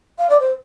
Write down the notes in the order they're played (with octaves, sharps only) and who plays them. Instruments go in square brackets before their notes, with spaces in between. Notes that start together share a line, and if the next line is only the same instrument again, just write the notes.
[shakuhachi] F5
D5
C5